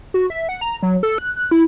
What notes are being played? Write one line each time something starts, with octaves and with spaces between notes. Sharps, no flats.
F#4
E5
F#5
A#5
F#3
A4
F#6
F#6
E4